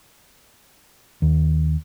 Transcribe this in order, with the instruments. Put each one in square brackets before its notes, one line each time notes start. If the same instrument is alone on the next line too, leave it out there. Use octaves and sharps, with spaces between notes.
[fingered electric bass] D#2